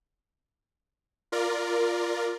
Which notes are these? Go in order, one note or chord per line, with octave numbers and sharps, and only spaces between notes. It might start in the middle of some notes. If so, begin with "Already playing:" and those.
F4 A#4 D5